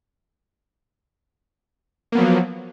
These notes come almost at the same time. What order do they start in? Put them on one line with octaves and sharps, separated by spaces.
A#3 B3 F#3 F3